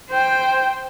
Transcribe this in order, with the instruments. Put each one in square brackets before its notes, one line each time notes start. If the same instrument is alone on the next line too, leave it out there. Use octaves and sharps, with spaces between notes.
[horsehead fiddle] C5 G5